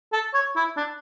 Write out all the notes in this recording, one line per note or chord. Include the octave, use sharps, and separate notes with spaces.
A4
C#5
E4
D4